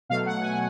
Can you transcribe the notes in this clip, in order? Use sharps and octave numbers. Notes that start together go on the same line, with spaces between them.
B2 F#3 A3 F5
F#5
G#5